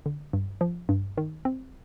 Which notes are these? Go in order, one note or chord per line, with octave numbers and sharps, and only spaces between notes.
D3
G2
F3
G2
D#3
C4